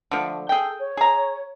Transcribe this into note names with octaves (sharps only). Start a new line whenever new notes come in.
D3 F3 A3
G#4 A4 G5
C#5
G#4 A#5